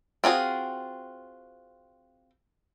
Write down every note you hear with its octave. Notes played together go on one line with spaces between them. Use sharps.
C4 F4 F#4 G#4